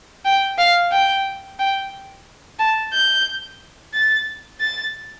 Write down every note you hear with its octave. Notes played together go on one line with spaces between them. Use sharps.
G5
F5
G5
G5
A5
G6
A6
A6